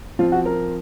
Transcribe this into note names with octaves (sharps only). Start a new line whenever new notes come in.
F3 C4 F4
F#4
A#4